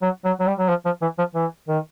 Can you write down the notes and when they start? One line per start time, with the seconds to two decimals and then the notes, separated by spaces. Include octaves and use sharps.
0.02 F#3
0.25 F#3
0.40 F#3
0.47 G3
0.59 F#3
0.69 F3
0.85 F3
1.02 E3
1.18 F3
1.35 E3
1.68 D#3